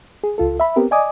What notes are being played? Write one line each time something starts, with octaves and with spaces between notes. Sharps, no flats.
G#4
C#2 F4 A4
E5 B5
B3 C4 G4 A#4
D5 D#5 G#5 D6 D#6